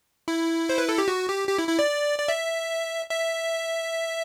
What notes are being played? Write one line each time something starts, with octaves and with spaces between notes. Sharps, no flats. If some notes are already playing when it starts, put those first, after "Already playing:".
E4
C5
B4
A4
G4
F#4
G4
G4
E4
E4
D5
D5
E5
E5